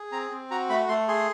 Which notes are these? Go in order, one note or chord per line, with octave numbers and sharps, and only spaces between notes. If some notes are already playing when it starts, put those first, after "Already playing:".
Already playing: G#4
C4 A#5
C4
F#4 A#5
A3 B5
A3 C6
G#4 C6